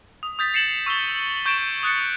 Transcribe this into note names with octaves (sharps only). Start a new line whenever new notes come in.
D#6
D#6 G6 A6 B6
A6 C7 C#7 E7 F#7
C#6 E6 A6 G7
C#6 G6 G#6 D7 E7
D#6 F#6 A6 C#7